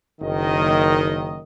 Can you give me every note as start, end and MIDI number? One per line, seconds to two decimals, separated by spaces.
0.21 1.42 30
0.21 1.42 51
0.21 1.42 75